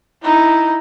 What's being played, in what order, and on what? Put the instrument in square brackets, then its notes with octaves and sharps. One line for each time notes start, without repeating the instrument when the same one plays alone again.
[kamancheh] D#4 E4